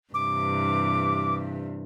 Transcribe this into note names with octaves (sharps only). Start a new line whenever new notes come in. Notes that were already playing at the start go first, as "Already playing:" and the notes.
G2 C3 E3 D6